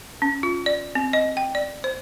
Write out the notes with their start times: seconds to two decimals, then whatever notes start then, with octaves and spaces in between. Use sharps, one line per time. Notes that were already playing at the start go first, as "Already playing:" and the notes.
0.22 C#4
0.43 F4
0.66 D5
0.95 C4
1.13 D#5
1.37 G5
1.55 D5
1.84 C5